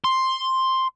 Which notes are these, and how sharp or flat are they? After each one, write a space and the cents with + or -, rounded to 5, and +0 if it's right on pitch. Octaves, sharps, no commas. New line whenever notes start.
C6 +5